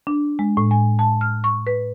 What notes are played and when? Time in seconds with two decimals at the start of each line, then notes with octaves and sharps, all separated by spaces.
0.07 D4
0.39 G#3
0.57 A2
0.71 G#5
0.99 A5
1.21 F6
1.44 C#6
1.67 B4